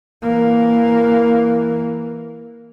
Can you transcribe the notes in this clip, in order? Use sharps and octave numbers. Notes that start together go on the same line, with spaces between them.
E3 A#3